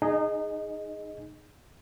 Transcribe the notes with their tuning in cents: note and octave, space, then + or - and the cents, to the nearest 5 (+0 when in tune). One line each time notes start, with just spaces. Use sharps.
D#4 -30 G#4 +0 D#5 +0